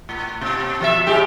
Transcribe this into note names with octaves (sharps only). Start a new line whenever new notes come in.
A2
B2
F3 A#4 E5
A2 G#3 G4